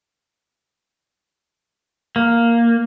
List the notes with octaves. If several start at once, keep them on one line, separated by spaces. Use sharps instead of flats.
A#3